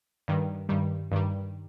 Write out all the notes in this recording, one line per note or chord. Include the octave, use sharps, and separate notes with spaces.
G2 D#3 G3
G2 D#3 G3
G2 D#3 G3